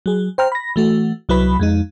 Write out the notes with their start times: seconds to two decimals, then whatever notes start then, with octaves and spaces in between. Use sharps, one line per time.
0.06 F#3 G#4
0.38 C5 G5 A#5 F6
0.52 B5 A#6
0.76 E3 A3 F#4
1.29 C2 F#3 E4 B4 B5
1.60 F2 G#3 D#4